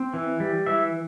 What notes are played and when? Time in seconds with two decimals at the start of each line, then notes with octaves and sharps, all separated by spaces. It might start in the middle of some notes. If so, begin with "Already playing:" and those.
Already playing: C4
0.14 E3
0.40 G3
0.66 E3 E5